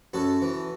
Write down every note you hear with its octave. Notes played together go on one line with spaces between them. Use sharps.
F#2 F#4 A4
E3